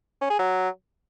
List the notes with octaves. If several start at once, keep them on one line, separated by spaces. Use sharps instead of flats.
C#4
G#4
F#3